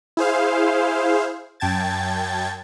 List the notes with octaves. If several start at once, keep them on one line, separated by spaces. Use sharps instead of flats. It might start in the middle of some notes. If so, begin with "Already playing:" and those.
E4 G#4 C5 F5
F#2 G5 A5 G#6 A6